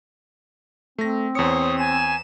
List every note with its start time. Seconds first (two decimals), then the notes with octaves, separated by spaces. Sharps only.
0.99 A3 C4 A#6
1.35 E2 C5 C#5 D#6 C#7
1.79 G#5 E7